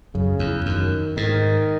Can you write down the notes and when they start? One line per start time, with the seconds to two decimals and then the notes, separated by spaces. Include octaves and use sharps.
0.14 F#2 C#3
0.39 E2
0.65 F#2 D#3
1.16 G#2 D#3